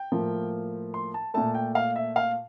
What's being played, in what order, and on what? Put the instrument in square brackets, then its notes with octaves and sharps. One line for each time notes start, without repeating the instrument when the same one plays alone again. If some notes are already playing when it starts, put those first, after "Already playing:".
Already playing: [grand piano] G5
A2 F3 A#3
C6
A5
A#2 A3 A5
G5
F5
E5
F5